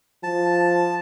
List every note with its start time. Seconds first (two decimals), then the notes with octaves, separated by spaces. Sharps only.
0.23 F3 A5